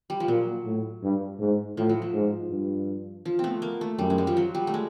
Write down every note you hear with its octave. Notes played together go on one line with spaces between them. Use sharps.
G3
F3
A#2 F#3
A2
G2
G#2
A2 F3
F#3
F3
G#2
G2
F3
A3 B3 C4
A#3
A3
F#2 G3
G#3
G3
F3
F#3
G3
A3
G#3